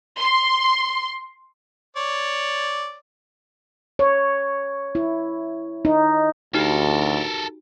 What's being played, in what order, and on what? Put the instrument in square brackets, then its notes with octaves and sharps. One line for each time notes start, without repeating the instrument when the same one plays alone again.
[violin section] C6
[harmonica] C#5 D5
[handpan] C#5
E4
D#4
[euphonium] D2 [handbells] D#4 F#4 G4 [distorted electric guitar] A4 A#4